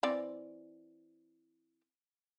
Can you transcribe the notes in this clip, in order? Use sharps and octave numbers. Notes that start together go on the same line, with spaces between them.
E3 C4 D5